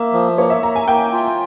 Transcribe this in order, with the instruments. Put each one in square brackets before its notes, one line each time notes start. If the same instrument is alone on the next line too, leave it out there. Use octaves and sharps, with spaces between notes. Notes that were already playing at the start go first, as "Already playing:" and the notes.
Already playing: [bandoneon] A#3 [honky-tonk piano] E5
[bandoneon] F3
[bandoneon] A#3 [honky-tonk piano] C#5
[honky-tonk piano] E5
[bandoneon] A#3 [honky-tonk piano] A#5
[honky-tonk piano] G#5
[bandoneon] A#3 [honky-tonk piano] G5
[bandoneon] F4